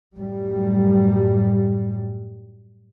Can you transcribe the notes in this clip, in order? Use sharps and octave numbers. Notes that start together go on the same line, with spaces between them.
F#2 A2 G3